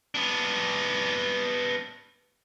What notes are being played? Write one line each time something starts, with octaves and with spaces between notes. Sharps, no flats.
B3 D4